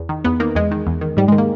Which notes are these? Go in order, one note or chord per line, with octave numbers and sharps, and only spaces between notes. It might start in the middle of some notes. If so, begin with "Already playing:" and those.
Already playing: E2
D#3
E2 B3
D#3 A#3
E2 G#3
D#3
E2
D#3
G#2 G3
G#3
D#3
A#3